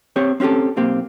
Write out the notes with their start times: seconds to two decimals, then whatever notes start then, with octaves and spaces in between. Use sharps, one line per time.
0.16 C4 G4 C#5
0.40 C4 C#4 F#4 G4 A4
0.77 B1 A#3 C4 G4